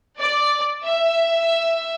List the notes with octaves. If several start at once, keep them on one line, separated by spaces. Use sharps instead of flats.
D5
E5